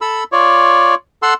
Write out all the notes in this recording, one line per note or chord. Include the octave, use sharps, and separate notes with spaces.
A4 B5 E6
F4 C#5 D5
A4 F#5 C6 E6